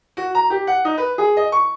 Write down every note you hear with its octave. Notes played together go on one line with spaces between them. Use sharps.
F#4
A#5
G4
F#5
D#4
B4
G#4
D#5
C#6